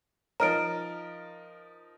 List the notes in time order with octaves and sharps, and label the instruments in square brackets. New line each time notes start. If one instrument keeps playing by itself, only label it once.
[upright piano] F3 D#4 A#4 [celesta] A#5 F6 D7